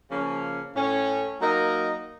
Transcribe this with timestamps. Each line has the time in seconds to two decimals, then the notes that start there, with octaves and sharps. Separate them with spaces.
0.11 C#3 F3 A#3 C#4
0.76 A2 A3 C#4
1.41 F#3 A#3 D#4 A#4 D#5